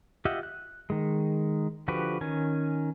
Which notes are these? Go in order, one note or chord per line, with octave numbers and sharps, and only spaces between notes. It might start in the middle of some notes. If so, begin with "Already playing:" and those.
F4 G4 D#5 E5 F#5
F#6
D#3 G#3
D3 F3 F#4 G4 B4
D#3 C#4 G#5